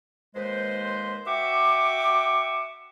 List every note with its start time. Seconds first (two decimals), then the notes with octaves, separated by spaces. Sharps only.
0.35 D#2 G#3 B4 C5
1.27 F#4 E5 G5 C#6 D6